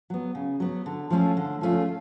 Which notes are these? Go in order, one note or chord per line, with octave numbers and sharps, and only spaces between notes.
F#3 B3
C#3
F#3 B3
D3
F3 A3 C#4 F4
D3
F3 A3 C#4 F4